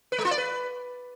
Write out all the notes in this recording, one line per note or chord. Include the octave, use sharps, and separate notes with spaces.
B4
G#3
F4
D5
B4